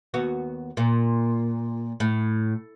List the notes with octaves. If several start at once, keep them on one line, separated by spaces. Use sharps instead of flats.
D#2 B3 F#4
A#2
A2